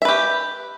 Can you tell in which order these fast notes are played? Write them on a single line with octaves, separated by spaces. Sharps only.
E5 B4 G4